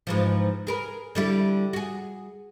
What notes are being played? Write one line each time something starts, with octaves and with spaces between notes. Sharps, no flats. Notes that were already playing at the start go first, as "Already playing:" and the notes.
G#2 E3 F3
G#4 A#4 B4
D3 G3 E4
F#4 G#4